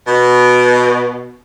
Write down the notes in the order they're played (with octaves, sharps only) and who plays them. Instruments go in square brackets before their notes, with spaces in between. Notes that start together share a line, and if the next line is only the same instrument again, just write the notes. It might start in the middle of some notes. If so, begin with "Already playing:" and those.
[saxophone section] B2